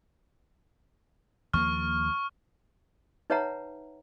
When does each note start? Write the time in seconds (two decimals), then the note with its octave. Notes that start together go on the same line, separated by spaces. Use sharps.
1.54 D#2 F3 A#3 C#6 F6
3.30 D#4 B4 C#5 E5 F#5 A#5